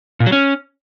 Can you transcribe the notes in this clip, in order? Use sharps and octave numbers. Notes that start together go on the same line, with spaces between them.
A#2
F#3
C#4